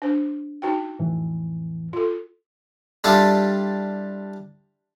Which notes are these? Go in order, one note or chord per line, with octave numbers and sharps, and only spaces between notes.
D4 C5
D#4 F#4 G5
F2 A2 E3
F4 A4
G3 D4 E4 F4 G4 A4